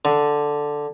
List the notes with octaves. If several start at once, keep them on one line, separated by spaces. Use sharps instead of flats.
D3